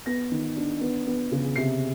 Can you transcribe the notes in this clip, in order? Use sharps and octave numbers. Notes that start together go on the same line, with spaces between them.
B3 A#6
D#3
D4
B3
B3
C#3
C3 C7